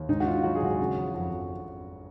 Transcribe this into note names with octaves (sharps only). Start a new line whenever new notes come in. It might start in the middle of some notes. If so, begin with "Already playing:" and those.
Already playing: D#2
G#2 D#4
F#4
D#3 F4
F#3 F#4
G#4
G#1 F#4
C#3
F3
F2 F#4
F2